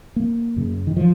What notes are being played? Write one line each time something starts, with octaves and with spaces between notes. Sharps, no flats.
A#3
F#2 C#3
D#3
F3